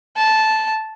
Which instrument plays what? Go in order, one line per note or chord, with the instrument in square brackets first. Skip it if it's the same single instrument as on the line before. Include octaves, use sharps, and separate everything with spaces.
[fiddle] A5